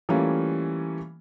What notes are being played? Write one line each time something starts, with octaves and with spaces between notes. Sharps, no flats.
E3 G3 A3 A#3 C#4 F4